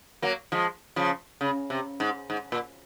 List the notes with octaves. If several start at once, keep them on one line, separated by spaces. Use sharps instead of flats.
F#3 A#3
F3 G#3
C#3 F3
C#3
C3
G#2
G#2
A#2